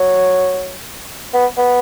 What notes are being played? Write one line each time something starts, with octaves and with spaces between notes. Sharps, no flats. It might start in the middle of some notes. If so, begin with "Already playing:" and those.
Already playing: F#3
B3
B3